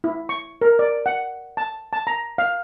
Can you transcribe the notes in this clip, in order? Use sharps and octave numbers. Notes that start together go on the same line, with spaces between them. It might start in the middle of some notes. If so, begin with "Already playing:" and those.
E4
C#6
A#4
D5
F#5
A5
A5
A#5
F5